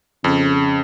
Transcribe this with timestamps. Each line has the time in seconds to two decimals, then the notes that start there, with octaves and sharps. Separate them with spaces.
0.24 F2 C#3